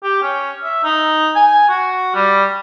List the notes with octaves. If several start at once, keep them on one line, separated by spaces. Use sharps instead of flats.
G4
C#4
E5
D#4
G#5
F#4
G3